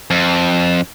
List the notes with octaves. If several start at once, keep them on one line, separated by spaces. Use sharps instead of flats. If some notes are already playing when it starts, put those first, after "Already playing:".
F2